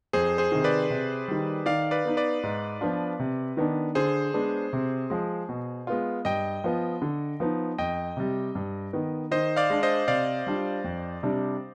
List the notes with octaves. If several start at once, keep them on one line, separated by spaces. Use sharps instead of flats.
F2 G#4 C5
G#4 C5
C3 D#3
B4 D5
C3
D#3 G3
D#3 D5 F5
B4 D5
B3 D#4
B4 D5
G#2
F3 B3 D4 F4
C3
D#3 B3 D4
D3 G#4 C5
G#3 B3 D4
C3
F3 G#3
B2
G#3 B3 F4
G2 D#5 G5
F3 B3 F4
D3
F3 B3 D#4
F2 D#5 G5
C3 G3
G2
D#3 B3
D#3 C5 D#5
D5 F5
G#3 D4
C5 D#5
C3 D5 F5
G3 D4 F4
F2
C3 G3 D4